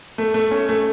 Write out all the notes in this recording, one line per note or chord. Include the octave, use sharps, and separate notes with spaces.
A3
A3
C#4
A3